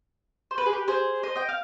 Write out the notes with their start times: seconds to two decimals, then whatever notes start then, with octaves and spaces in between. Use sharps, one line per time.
0.51 C5
0.58 B4
0.66 G#4
0.73 G4 B4
0.88 G#4 C5
1.23 C5 D#5
1.36 D#5 G5
1.49 F5